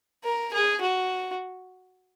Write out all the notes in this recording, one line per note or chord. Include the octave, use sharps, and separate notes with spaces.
A#4
G#4
F#4